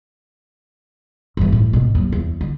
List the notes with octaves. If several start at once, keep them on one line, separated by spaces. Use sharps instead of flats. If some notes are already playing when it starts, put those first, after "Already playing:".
G1 E3
A2
G#1 B2
D#2 F#3
E2
D3